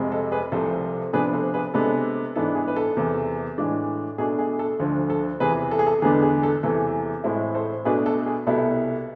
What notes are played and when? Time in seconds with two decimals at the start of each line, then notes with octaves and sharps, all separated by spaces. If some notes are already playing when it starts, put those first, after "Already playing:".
Already playing: F2 C3 G#3
0.12 A4
0.32 G#4 B4
0.52 C2 C3 F3 A3 A4 C5
1.13 C3 F3 B3 D4 G#4 B4
1.33 A4 C5
1.54 G#4 B4
1.74 C3 G#3 B3 D4 A4
2.36 G#2 E3 B3 D4 A4
2.55 G#4
2.68 B4
2.76 A4
2.97 E2 C3 E3
3.58 A2 E3 G#3 D4
4.18 B2 A3 D4 G#4
4.39 G#4
4.59 A4
4.80 D2 D3 F3 A4
5.10 A4
5.40 E2 C3 E3 G#4 B4
5.71 A4
5.79 G#4
5.87 A4
6.02 E2 D3 G#3 B3 D4 G#4
6.22 G#4
6.43 A4
6.63 E2 C3 E3 A4
7.24 A2 G#3 C4 E4 A4
7.55 A4 C5
7.85 B2 A3 D4 G#4 B4
8.06 A4
8.26 G#4
8.47 C2 B2 B3 E4 A4